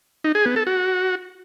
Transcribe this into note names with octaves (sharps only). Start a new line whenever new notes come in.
D#4
G#4
B3
A4
F#4